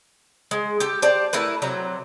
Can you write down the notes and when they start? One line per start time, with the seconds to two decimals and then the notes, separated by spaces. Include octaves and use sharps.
0.51 G#3
0.80 G4 A4
1.02 G4 C5 D5 A5
1.33 A3 E4 A#4 B4
1.62 C3 F#3 A#5